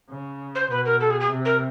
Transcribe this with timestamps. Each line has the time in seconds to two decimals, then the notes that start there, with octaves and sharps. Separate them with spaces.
0.10 C#3
0.55 C5
0.70 B2 B4
0.86 A#4
1.00 A4
1.10 G#4
1.21 G#4
1.30 C3
1.45 A#4